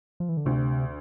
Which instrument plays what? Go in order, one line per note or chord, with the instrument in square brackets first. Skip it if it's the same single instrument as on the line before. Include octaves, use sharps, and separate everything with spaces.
[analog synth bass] F3
E3
D3
[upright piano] D2 [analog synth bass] C3